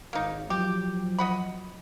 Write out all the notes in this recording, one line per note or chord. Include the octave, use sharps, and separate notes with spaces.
G#1 A#3 D#4
F3 F#3 G4
D#5 F#5 B5